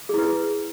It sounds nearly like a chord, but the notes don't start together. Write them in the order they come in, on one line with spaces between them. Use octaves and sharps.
G#4 E4 B4